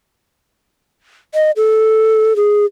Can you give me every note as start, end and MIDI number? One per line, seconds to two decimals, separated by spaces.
1.35 1.51 75
1.57 2.36 69
2.36 2.65 68